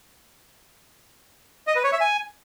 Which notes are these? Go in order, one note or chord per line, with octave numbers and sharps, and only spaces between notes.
D#5
B4
C#5
E5
G#5